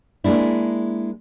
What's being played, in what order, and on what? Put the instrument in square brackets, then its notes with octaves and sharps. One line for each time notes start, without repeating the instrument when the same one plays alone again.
[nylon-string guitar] G#3 A#3 D4 E4